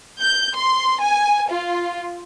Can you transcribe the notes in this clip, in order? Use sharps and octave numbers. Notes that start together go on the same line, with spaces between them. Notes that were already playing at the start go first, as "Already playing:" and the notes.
G6
C6
G#5
F4